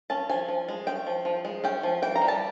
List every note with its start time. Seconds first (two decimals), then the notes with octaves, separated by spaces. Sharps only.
0.10 C#4 A5
0.29 F3 G#5
0.48 F3
0.68 G#3
0.87 C#4 G5
1.07 F3
1.25 F3
1.45 G#3
1.64 C#4 G5
1.83 F3
2.02 E3 G5
2.16 A#5
2.22 G3
2.28 A5